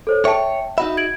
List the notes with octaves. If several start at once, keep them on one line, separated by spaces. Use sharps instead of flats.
A4 C5 C#5
C#5 E5 G5 A5
D#4 F#4 E5 B5
G#6 D7 F#7